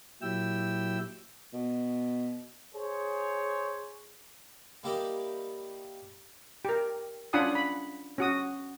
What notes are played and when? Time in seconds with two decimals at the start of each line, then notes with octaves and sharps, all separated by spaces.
0.22 A#2 F#3 E4 G4 G5 E6
1.53 B2
2.74 G#4 C5 C#5
4.83 G3 A#3 E4 G4 D5 D#5
6.65 G4 A#4
7.33 C#4 D4 F4 F#5 G#5 D#6
7.55 B5
8.18 C#4 F#4 D#6